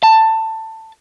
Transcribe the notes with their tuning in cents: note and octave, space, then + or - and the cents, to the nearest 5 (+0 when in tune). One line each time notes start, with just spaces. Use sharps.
A5 +15